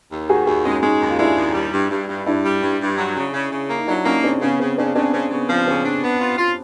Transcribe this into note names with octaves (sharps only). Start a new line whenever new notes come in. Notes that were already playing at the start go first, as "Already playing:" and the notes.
D#2
D#3 F#4 G#4
D#2 F#4 G#4
G#3 C#4 D#4
G#3 C#4 D#4
D#2
F4
G#3 D4 E4
D#2
G3
G2
G2
G2
G2 D4 E4
G3
G2
G2
F#3
C#3
C#3
C#3
A#3
D#4
F#3 D4 E4
A#3 C#4 D#4
C#3 C4 D4
C#3 B3 C#4
C#3 C4
C#3 C4 D4
C#3 C4 D4
C#3 C4
C#3 B3
F3 C4
C#3 C4
D4
B3
F4
F4